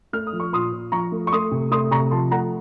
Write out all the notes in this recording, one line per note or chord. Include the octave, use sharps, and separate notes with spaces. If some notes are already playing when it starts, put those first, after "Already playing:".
A3 F6
D#6
F3
C#6
A#2 C6 D#6
A#2
F3 A#5 C#6
A3
C#6
A3 C6 D#6
C3
A3 C6 D#6
C3 A#5 C#6
F3 A5 C6
A3 F#5 A#5